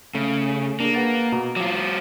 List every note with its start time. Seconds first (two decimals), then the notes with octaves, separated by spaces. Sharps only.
0.15 C#3 A3
0.80 A#3 D4 G#4
0.94 B4 F#5 A6
1.32 B2 A#5
1.56 F#3 F4 D6